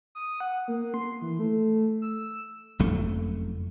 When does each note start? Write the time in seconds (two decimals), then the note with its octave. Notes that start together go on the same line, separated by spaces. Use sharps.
0.15 D#6
0.40 F#5
0.68 A#3
0.94 C6
1.22 E3
1.39 A3
2.02 E6
2.79 F#1 F2 A3